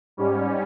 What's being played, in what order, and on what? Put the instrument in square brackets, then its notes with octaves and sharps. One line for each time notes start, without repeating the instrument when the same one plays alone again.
[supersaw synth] G#2 G3 C#4